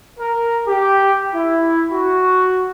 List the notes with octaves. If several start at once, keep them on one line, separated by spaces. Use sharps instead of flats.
A#4
G4
E4
F#4